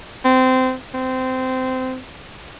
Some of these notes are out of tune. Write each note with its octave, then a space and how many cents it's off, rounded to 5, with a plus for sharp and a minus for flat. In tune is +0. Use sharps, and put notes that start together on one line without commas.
C4 -20
C4 -20